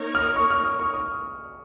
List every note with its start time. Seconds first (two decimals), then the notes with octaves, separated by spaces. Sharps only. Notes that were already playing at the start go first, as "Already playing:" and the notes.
Already playing: A#3 D#4 A#4 C#5
0.15 F6
0.22 D#6
0.36 C#6
0.50 F6
0.64 D#6
0.80 C#6
0.94 D#6